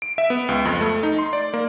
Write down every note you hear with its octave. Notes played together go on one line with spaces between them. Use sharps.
D7
E5
B3
C#2
F2
A3
D#4
C6
D5
A#3